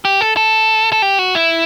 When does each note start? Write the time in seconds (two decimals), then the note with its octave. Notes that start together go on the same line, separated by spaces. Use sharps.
0.05 G4
0.21 A4
0.37 A4
0.92 A4
1.02 G4
1.19 F#4
1.35 E4